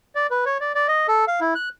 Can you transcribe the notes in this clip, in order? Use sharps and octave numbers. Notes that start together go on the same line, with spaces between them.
D5
B4
C#5
D5
D5
D#5
A4
F5
E4
F#6